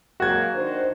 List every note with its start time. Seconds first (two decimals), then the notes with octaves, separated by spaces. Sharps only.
0.20 F#3 G#3 A#3 F#4 G#6
0.53 D#3 D4 C5